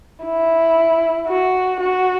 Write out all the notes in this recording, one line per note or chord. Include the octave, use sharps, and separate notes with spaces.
E4
F#4
F#4